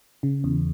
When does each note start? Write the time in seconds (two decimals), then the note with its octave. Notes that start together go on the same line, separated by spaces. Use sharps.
0.23 C#3
0.44 E2